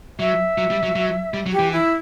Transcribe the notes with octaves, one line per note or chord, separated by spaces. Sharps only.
F#3 E5
F#3
G3
F#3
F#3
G3
F#3
G4
E3
E4